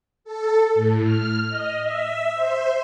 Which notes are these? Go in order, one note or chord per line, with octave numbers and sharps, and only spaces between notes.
A4
A2
F6
D#5
E5
C5